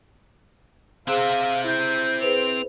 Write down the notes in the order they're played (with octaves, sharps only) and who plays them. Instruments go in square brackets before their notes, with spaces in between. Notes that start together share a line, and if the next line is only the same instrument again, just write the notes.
[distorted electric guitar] C4 E5 [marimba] G#4 C5 F#6 [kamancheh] F5
[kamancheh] E4 [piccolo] G6
[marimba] G#4 B4 C5 [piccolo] F7